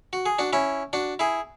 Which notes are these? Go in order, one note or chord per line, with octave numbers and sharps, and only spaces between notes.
F#4
G#4
D4 F#4
C#4 E4
D4 F#4
E4 G#4